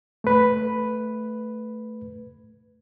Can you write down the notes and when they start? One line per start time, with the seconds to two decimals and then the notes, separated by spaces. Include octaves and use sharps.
0.24 A3 B4